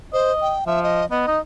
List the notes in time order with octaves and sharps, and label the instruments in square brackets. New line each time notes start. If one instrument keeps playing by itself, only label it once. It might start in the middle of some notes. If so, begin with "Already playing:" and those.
[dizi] C5 [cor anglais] D#5
[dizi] G5
[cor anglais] F3 [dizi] E5
[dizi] D#5
[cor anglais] B3 [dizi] D#5
[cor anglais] D#4